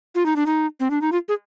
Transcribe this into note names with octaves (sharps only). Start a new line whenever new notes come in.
F4
D#4
D4
D#4
C4
D4
D#4
F4
G#4